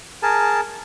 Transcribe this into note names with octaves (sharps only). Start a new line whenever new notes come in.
G#4 A#4 A5